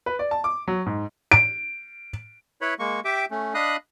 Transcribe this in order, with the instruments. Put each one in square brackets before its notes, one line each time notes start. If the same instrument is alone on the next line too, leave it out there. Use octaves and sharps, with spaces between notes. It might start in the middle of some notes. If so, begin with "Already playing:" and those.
[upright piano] B4
D5
A5
D6
F#3
G#2
[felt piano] D7
[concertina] E4 B4 C#5 B5
G#3 A#3 C#6
G4 E5 G5 D6
A3 C#4
D4 D#5 F5 B5 D#6 F#6